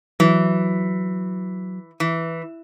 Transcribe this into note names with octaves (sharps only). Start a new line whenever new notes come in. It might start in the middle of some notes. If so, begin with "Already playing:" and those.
E3 F#3
E3